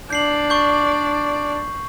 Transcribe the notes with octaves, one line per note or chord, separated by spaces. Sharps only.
D4 D5 G6 C7 F#7
C#6 G6